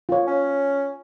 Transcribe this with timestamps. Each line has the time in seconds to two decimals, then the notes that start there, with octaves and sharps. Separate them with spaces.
0.09 F4 C#5
0.28 C#4